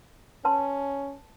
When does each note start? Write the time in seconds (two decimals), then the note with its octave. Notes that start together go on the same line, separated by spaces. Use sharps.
0.45 C#4 B4 A5 C6